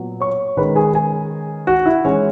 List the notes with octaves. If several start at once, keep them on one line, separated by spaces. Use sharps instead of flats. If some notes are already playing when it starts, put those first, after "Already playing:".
Already playing: A#2 F#3 B3
C#5 C#6
D#3 G#3 C#4 B4 B5
G#4 G#5
G#4 G#5
F#4 F#5
E4 E5
E3 G#3 C#4 C#5